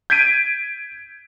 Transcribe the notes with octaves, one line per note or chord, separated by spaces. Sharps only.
G6 G#6 B6 D7 D#7